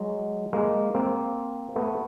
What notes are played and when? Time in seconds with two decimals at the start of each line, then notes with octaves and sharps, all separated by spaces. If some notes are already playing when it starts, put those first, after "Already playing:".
Already playing: F#3 G#3
0.53 G#3 A#3
0.94 A#3 C4
1.76 A3 B3